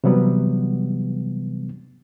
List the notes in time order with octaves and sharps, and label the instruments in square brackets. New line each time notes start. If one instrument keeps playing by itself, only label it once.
[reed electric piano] C3 E3 F#3 G3 B3